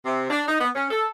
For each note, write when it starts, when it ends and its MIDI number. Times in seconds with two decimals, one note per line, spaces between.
0.06 0.27 48
0.30 0.44 62
0.48 0.60 63
0.61 0.70 59
0.75 0.90 61
0.91 1.07 69